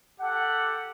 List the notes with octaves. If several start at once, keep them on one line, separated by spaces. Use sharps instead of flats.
G4 A4 F#5